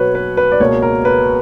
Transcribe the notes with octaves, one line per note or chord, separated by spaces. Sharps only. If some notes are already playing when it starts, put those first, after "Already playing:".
Already playing: B2 F#3 B3 B4 C#5
B4
B4
D5
C#2 B2 A#3 C#5
A#4
B4